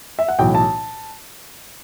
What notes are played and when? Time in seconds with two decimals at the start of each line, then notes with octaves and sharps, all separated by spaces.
0.19 E5
0.28 F#5
0.39 B1 A2 E3 G5
0.55 A5